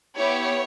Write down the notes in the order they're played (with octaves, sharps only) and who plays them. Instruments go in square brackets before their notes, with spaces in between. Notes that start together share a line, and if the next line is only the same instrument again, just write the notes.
[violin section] B3 E4 G4 C#5